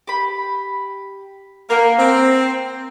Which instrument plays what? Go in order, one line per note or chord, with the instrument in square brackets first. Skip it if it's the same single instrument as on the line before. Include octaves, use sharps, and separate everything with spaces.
[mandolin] G4 B5
[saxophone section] A#3 [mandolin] A#4 F#5 G5
[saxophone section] C4 [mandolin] A#5